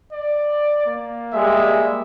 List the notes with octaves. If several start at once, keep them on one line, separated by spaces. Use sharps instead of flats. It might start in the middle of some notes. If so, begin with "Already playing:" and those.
D5
A#3
G3 G#3 E5